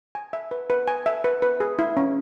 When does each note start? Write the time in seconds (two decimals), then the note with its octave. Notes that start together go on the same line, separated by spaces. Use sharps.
0.15 G#5
0.33 E5
0.51 B4
0.70 B4
0.88 G#5
1.06 E5
1.24 B4
1.42 B4
1.60 G#4
1.79 E4
1.97 C#4